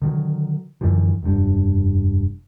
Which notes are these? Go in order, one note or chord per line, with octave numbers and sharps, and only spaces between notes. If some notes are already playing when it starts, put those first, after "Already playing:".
D3 D#3 F#3
F#2 D3 E3 F3
F1 G2